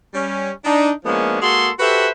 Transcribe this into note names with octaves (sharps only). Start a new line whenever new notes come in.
G3 C#4
D4 D#4
F3 G#3 A#3 B3 C#4 D4
G#3 A#3 F#4 G#4 A4 C6
F#4 G4 A4 B4 C5 E5